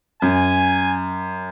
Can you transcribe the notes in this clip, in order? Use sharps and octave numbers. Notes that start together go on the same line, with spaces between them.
F#2 G#5